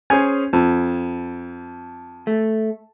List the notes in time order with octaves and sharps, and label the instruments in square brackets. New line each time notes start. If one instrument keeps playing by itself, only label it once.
[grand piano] C#4 G#4 C5 [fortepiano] G#5
[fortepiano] F2 [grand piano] A5
[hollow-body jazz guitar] A3